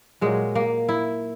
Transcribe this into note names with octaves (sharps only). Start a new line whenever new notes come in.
A#2 F#3 G#3
A#3
E4